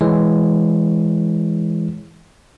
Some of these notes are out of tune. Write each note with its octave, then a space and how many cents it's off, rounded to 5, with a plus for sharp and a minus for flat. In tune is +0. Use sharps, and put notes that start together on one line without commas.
E3 +0 G#3 +0 C#5 +0